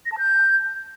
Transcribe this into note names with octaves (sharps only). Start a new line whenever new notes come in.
A#6
A5
G6